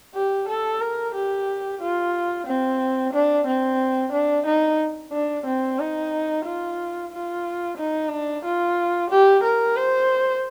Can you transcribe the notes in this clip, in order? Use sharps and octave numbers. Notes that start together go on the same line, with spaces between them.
G4
A4
A#4
G4
F4
C4
D4
C4
D4
D#4
D4
C4
D#4
F4
F4
D#4
D4
F4
G4
A#4
C5